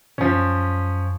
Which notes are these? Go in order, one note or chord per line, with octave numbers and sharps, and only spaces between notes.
F#2 F3 C#4